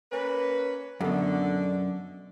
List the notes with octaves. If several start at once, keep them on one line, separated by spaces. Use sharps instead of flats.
A#3 C#4 B4
F#2 B2 D3